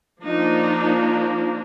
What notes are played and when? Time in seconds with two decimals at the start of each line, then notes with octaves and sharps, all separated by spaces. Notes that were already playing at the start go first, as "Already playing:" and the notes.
0.24 F3 A#3 D4 D#4